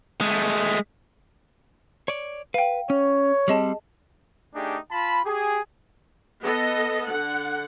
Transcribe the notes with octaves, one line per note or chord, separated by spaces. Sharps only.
G#3 A3
C#5 D5
B4 F5 G5
C#4 C#5
G3 C4 G#4 D#5 A5
A3 D4 D#4 G4 G#4
F4 A5 B5
G4 G#4
B3 A4 D#5
D3 F#5